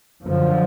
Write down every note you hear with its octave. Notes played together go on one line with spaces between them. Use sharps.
F#2 D3 F3